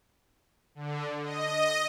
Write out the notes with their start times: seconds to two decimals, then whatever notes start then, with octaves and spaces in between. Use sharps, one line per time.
0.75 D3
1.22 D#5